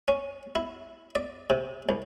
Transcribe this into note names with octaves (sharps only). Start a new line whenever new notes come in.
C#4
E4
D5
C3
C2